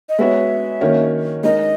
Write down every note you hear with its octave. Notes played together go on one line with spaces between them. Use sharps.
D#5
G#3 B3 F#4 C#5 E5
D#3 A#3 C#4 F#4 C#5
G#3 D#4 A#4 D#5